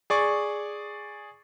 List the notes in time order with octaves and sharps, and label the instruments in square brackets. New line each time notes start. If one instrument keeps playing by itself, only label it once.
[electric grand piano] G#4 D5 C#6